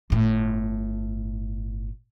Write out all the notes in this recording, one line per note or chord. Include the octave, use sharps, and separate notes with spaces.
G1 A2